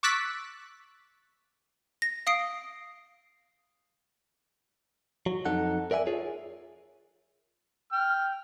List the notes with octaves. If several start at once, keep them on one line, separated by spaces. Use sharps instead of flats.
C#6 D6 E6 F#6 A6 B6
A#6
F5 D#6 C7 D7
F#3
F2 D#4 A4 F#5
A#4 D5 E5 G5 G#5
F4 G#4 C#5
G5 F6